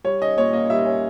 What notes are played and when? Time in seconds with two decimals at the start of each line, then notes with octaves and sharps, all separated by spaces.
0.04 G3 C#5
0.21 C#4 D#5
0.37 A#2 C#5
0.53 A#3 D#5
0.70 G3 E5
0.85 C#4